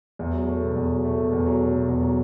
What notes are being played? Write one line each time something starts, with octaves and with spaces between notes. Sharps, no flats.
E2
F#3
A3
B2
E2
F#3
A3
B2
E2
F#3
A3
B2
E2
F#3